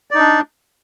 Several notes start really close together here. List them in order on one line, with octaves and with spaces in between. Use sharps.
D5 D#4 D4